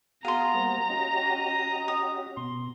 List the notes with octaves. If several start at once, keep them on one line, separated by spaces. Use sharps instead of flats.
B3 F#4 G#4 F5 A#5 C6 D#6
G3 A#3 C5
C#4 F#4 G4 D#5
D#6
B2 C6